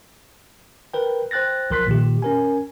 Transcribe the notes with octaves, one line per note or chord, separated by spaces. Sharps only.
A#4 B4 G5
C5 G5 F#6 A6 A#6
B1 F3 A#4 C6 F#6 B6
A#2 D#3 G4
C#4 A#4 G#5